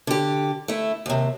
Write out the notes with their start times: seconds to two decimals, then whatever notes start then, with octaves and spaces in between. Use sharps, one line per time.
0.07 D3 G4
0.68 A3 E4
1.06 D#2 C3